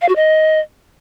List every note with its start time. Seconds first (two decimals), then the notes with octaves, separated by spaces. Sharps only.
0.01 F5
0.09 F#4
0.16 D#5